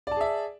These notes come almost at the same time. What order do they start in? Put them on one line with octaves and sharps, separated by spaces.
D5 A5 G#4 E5